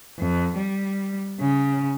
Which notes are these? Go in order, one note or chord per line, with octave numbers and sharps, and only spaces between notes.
F2
G3
C#3